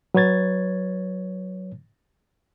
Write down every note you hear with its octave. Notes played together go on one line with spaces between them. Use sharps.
F#3 B4 C#5 G#6 A6